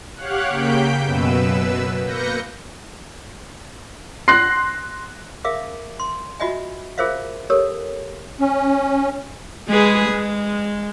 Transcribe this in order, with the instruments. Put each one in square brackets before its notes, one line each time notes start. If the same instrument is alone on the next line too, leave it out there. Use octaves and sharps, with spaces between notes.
[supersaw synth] G4 C#5 F5 F#5 F#6
C#3 A#3 G5 G6 B6 D7
F#2 B2 B4 E6
A#3 B4 G6 A#6 C#7
[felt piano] C6 [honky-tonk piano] F#6 A#6 C7
[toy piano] G#4 A#4 E5 F5 D6
C6
F4 F#4 D#5 E5 G#5
F4 G#4 A#4 C5 E5 F5
G4 A4 A#4 C#5
[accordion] C#4
[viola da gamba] G#3 G#4 B4
G#3